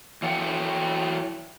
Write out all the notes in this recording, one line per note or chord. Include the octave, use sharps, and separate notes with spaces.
E3 F#3 A4 F#5 G5